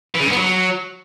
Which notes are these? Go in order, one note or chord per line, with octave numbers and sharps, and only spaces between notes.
E3
C#3
G2
B3
F#3